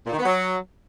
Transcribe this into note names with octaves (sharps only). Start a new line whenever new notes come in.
A#2
D#3
B3
F#3